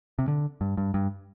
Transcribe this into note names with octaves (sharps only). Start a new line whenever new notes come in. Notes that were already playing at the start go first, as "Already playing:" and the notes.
C3
D3
G2
G2
G2